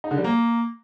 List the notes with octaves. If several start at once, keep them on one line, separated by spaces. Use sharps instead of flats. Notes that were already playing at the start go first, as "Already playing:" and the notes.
D#4
D3
G3
A#3